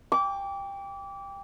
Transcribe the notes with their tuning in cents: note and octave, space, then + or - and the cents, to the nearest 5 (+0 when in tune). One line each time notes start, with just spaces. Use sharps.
G5 +20 D6 -25